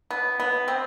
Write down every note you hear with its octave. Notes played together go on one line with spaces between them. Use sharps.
B3
B3
C4